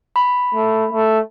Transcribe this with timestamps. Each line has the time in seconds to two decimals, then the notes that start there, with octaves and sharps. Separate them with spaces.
0.16 B5
0.54 A3
0.91 A3